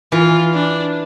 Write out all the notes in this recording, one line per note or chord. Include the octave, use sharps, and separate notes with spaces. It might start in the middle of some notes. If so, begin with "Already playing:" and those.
E3 F4
D4